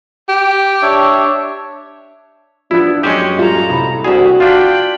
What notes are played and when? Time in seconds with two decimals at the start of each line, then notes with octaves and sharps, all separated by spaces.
0.29 G4
0.82 D4 C#5 E5
2.71 F3 B3 D4 E4
3.03 F#2 G#3 C#4 G4
3.39 G3 F4 A4 A#5
3.69 C2 B5
4.04 C2 D4 E4 F#4 G#4
4.40 D4 F4 F5 G5 B5